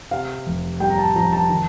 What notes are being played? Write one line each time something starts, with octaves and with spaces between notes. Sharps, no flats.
C3 F5
F1
G3 G5
A#5
A5
F2 A#5
A5
D#3